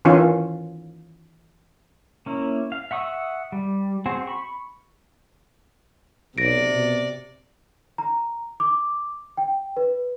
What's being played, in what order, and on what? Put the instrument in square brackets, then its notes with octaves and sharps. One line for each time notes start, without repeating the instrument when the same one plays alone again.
[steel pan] D#3 E3 C#4 F4
[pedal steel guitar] A#3 C#4 E4
F5
E5 F#5 C#6 D#6 E6
G3
C4 F#4 G#4 C5
B5 C#6
[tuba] B1 [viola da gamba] C3 D5 [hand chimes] A#6 D7
[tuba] B2
[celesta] A#5
D6
G5
B4